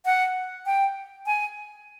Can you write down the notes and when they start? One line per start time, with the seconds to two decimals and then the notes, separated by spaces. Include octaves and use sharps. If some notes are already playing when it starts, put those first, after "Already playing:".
0.05 F#5
0.66 G5
1.26 G#5